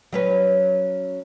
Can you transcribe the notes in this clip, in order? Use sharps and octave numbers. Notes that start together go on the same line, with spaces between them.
F#3 C#4 B4